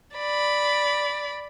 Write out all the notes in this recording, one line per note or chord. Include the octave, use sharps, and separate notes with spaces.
D5 B5